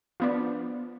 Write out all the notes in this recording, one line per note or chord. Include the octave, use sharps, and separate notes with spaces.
F3 B3 D4